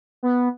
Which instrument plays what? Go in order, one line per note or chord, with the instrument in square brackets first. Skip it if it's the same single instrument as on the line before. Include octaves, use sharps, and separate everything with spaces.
[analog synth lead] B3